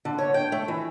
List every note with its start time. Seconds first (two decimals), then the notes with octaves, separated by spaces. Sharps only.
0.05 D3
0.18 C#5
0.34 G5
0.52 A3
0.68 E3